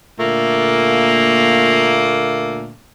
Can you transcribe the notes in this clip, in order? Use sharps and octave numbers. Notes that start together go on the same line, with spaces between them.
A#2 D3 A3 A#3